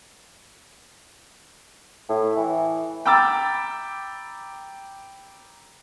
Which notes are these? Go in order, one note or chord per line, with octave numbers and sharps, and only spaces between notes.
A2
E3
G5 A#5 B5 D6 E6 A6